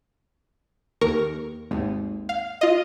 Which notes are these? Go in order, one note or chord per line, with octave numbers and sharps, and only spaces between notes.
D#2 A#4 C#6
G#1 D#2
F5
F4 D#5